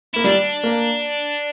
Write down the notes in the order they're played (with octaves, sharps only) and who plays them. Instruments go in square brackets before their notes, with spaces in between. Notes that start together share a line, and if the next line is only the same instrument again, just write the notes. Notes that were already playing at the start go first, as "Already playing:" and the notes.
[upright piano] A#3 [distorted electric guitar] E4
[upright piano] G3 [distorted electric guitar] D4
[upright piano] A#3